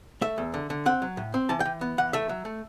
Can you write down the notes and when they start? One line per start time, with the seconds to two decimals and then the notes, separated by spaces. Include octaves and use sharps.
0.21 A3 E5
0.38 E2
0.54 D3
0.70 D3
0.86 C4 F#5
1.02 F#3
1.17 A2
1.34 C4
1.49 E3 A5
1.60 E3 G5
1.81 B3
1.98 E3 F#5
2.13 A3 E5
2.29 F#3
2.45 A3